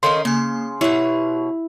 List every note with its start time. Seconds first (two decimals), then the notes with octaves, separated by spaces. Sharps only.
0.03 D#3 C#4 A4 C#5 D#5 F5 C6
0.25 C#3 A#3 G#5
0.81 B2 E4 G4 C#5